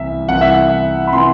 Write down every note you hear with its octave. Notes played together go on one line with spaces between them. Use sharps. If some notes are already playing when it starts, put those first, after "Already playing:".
Already playing: C2 C3 E3 E5
C2 C3 E3 F#5
E5
F#5
B5
C3 E3 C6